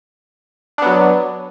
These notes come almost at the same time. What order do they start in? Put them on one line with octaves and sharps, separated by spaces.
D4 B3 F#3